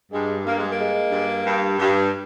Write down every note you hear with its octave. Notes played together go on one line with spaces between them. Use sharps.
G2 G#3
G2 A#3
G#3
A#3
G#3
G2
G2
G2